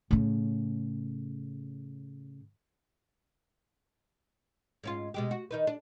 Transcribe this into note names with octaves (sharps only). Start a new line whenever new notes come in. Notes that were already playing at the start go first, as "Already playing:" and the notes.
A2 C#3
G#2 C#4 F4
B2 G#3 G4
F#4
D#3 D#4 B4
D4